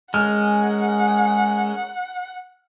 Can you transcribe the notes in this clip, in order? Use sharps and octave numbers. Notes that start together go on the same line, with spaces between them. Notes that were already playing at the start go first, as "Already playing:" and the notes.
G#3 C#4 G#4 A#4 F#5 F6